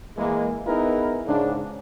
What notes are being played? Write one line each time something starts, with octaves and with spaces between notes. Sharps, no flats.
E3 G#3 A#3
B3 D#4 E4 G#4 A#4 B4
G#2 C#3 D4